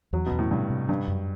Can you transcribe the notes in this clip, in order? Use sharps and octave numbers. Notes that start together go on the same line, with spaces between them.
E2 F#3
B2
E2
A2
G2 C3
C3
G2 D4
F#2